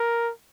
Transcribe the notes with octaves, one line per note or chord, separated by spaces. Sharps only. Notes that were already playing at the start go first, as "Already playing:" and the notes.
Already playing: A#4